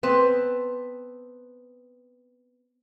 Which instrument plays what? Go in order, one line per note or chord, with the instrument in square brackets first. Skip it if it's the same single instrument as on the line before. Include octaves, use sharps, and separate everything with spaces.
[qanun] B3 C4 B4 A5